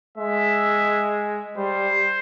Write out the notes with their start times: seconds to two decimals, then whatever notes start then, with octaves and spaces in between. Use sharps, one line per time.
0.18 G#3 E5
1.57 G3 C5